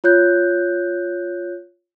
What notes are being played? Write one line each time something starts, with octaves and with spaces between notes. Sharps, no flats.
F4 C#5 F#6 G6